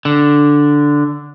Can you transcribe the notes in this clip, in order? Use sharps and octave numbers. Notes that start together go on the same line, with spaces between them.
D3